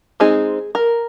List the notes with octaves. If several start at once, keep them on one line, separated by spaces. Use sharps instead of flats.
G#3 C4 D#4 G#4
A#4